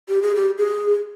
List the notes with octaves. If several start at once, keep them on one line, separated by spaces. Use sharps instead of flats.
G4
G#4
G4
G#4